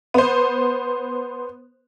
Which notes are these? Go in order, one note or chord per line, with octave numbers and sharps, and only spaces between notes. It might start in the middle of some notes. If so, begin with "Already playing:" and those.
B3 C5